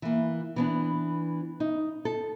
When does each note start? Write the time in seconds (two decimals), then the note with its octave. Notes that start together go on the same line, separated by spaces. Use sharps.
0.02 E3 A#3
0.56 E3 B3 D4
1.60 D#4
2.05 A4